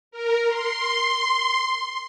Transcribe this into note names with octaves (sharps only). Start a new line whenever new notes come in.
A#4
C6